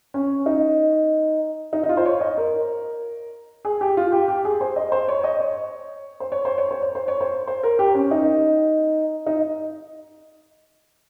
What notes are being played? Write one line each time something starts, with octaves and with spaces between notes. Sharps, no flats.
C#4
D#4
D#4
D#4
F4
C5
C#5
D#5
A#4
G#4
G4
F4
G4
G4
G#4
C5
D#5
C5
C#5
D#5
C#5
C5
C#5
C5
C#5
C5
C#5
C5
C#5
C5
C5
A#4
G4
C#4
D#4
D#4